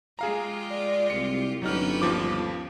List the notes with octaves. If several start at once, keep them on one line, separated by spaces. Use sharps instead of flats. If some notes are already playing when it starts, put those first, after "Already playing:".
G#3 F4 G4 G#4 F5 A#5
D5
C2 C#7
G1 F#3 C#4 D#4 G4 B4 F6
D#2 F3 D6